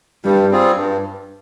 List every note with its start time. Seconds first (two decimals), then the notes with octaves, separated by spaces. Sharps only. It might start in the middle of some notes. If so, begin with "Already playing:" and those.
0.25 G2 G3
0.51 G3 C4 F4 G#4
0.76 G2